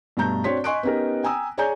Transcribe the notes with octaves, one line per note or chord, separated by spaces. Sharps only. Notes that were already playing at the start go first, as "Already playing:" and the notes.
G2 B2 A3 A5 A#5 G6
C4 D4 F#4 C#5 C6 B6
D#5 G#5 C6 C#6 F#6 D7
B3 C#4 D#4 G4 A#4
G5 G#5 A#5 D#6 E6
G#4 C#5 D5 G#5 A#5 G6